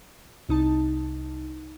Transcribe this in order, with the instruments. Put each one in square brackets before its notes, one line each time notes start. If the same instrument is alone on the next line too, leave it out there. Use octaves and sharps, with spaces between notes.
[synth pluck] C2 D#4 A5